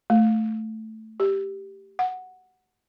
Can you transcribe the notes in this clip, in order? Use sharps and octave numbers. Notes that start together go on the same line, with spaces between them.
A3
G4
F#5